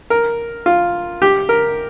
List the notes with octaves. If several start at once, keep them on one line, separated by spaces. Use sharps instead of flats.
A#4
F4
G4
A#4